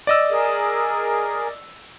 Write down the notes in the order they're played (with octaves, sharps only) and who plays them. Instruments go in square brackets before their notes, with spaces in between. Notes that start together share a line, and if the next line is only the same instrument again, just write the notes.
[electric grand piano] D5 D#5 E6
[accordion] G#4 A#4